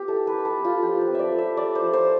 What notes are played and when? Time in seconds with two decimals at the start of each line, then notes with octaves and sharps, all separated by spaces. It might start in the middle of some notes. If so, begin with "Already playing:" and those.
Already playing: B3 G4
0.08 E4 A4
0.27 B4
0.33 E4
0.45 A4
0.58 B3
0.65 F4
0.82 F3 G4
1.01 B4
1.07 C4
1.15 D5 E5
1.32 A3
1.38 E5
1.57 A3 D5
1.75 C5
1.81 F3
1.93 C5